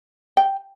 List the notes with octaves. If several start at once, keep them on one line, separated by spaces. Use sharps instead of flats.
G5